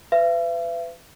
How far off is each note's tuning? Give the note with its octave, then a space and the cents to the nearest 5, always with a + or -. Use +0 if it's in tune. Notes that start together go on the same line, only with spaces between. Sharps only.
B4 +35 E5 +45